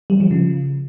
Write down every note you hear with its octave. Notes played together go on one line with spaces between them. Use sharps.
G3
F3
C#3